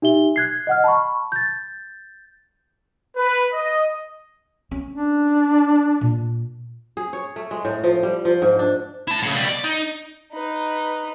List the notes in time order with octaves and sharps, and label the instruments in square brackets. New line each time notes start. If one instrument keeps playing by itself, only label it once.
[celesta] D#4 G4 E5 G7
F#6 G#6 C7
D#5 F#5 F6
A5 B5 C#6
G6 A6
[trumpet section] B4
D#5
[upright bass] C#4
[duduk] D4
[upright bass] A#2
[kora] G#4
C#5
A3
G#3
A2
F3
G3
F3
G#2
D4
[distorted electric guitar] E4 A5
A2 C#3
B2 G3
D5
D#4
[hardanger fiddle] D#4 B4